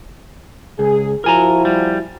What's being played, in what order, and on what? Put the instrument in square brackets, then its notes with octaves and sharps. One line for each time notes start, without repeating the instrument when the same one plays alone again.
[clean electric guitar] C#2 [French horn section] G#4
[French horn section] F3 E4 F#4 [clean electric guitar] A#4 G#5 A#5
[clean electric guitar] G3